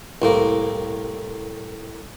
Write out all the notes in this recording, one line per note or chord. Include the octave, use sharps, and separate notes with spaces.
C2 A2 A#3